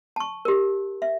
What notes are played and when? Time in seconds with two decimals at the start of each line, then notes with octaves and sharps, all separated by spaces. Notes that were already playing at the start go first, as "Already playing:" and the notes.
0.16 A5 C#6
0.45 G4 A#4
1.02 E5